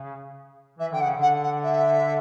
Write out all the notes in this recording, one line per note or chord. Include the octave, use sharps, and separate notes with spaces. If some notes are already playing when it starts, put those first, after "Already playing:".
Already playing: C#3
E3 E5
D3 G5
F#5
C#3
D3 F#5
F#5
E5